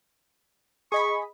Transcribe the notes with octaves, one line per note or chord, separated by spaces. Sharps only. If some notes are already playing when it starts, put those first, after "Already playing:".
G#4 D#5 B5 C#6